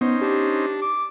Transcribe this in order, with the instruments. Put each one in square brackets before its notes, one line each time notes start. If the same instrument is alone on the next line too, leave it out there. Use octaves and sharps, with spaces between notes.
[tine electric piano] B3 [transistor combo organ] C#4 D#4 C5
[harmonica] D4 [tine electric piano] G4
[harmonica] D6